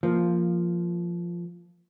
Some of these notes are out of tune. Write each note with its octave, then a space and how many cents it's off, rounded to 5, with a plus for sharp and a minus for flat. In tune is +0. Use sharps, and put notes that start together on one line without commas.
F3 -10 A#3 +0